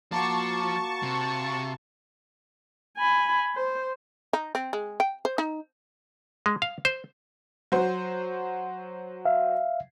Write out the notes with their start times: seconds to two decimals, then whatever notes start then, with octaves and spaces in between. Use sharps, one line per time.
0.12 F3 A#3 F4 F#4 A5 C#6
1.03 C3
2.98 G#5 B5
3.56 C5
4.33 D#4
4.55 C4
4.73 G#3
5.00 G5
5.25 C5
5.38 D#4
6.46 G#3
6.62 F5
6.85 C5
7.72 F#3 F#4 C5
9.25 E5 F5